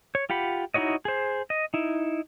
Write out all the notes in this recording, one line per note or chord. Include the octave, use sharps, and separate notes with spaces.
C#5
F4 G4 F#5 B5
D#4 E4 F#4 C#5 D#5
G#4 C5
D#5
D#4 E4